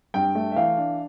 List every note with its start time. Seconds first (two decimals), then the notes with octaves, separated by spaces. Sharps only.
0.14 G2 G5
0.35 A3
0.52 E5
0.56 E3 F5
0.77 D4